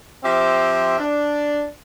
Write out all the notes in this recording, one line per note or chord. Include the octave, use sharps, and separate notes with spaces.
F3 C4 G4 E5
D4